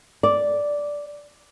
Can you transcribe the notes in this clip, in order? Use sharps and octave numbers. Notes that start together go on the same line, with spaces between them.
D5